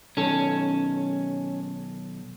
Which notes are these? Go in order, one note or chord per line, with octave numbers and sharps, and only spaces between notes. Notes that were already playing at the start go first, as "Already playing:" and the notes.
B1 D#3 C#4 A4